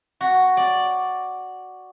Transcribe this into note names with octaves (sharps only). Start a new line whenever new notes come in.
F#4
D5